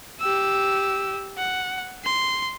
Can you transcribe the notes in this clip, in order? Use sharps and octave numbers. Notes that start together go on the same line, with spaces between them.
G4 E6
F#5
C6